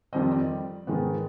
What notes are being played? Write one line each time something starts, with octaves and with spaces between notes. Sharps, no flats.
F2 D#3 G3 C4 D#5
D5
G#2 D#3 G#3 B3